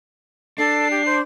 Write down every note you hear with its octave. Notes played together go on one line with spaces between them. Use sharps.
D4 A4 C7
G4
C5